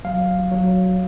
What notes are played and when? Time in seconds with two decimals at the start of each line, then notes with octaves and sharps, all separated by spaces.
0.04 F#3 F5
0.52 F#3